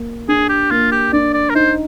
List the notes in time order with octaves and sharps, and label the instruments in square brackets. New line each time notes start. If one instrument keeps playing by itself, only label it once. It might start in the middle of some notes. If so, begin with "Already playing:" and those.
Already playing: [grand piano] A#3
[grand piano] D4 [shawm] G#4
[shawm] G4
[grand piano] A#3 [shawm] F4
[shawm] G4
[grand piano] D4 [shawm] D5
[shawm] D5
A#4
[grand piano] D#4 [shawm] C5